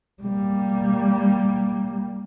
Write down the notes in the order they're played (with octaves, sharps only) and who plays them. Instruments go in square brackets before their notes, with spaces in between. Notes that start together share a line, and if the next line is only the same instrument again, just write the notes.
[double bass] G3 A#3